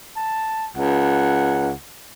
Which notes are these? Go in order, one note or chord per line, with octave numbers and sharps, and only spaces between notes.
A5
C#2 F#5